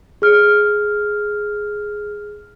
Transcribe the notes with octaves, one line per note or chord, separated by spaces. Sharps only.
G#4 F6